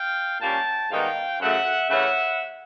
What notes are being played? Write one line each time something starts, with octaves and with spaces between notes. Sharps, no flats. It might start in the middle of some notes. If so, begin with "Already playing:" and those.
Already playing: F5 G5
A#2 G3 A#3 C#4 G5 A5
G#2 D#3 G3 B3 D#4 F5 G5
F#2 C#3 F#3 A3 E5 F#5
C#3 E3 A3 C#4 E5 F#5